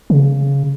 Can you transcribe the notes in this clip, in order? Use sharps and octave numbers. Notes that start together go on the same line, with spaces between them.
C#3